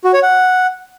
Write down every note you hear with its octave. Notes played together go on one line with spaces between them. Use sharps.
F#4
C#5
F#5